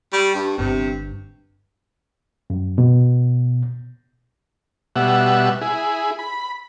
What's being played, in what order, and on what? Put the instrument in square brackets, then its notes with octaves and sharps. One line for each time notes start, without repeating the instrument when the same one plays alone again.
[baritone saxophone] G3 [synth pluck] C#6 A6
[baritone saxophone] G2
[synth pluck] G1 G2 [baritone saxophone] C3
[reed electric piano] F#2
B2
[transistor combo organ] B2 G3 E5 F#5
E4 G#4
B5